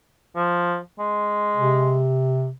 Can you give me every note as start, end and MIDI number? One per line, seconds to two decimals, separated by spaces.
0.36 0.77 53
0.99 2.04 56
1.57 2.50 48